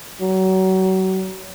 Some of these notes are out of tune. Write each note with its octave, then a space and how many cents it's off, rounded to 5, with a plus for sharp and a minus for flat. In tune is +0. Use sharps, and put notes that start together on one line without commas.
F#3 +30